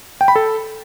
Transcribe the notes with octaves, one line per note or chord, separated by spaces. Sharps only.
G5
B5
A4